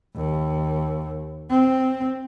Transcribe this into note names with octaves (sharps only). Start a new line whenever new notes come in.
D#2
C4